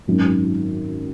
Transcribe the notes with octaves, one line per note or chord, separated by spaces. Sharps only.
G#1 F#2 D#3